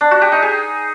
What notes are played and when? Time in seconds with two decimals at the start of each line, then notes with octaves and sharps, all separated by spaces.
0.01 D4
0.11 F#4
0.22 G4
0.32 D#4
0.42 G#4